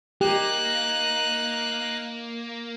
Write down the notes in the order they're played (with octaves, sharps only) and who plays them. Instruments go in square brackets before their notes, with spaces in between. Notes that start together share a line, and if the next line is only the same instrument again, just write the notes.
[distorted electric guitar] A#3 [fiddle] D#4 F#6 [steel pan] G4